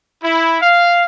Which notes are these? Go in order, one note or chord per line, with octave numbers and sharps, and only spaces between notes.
E4
F5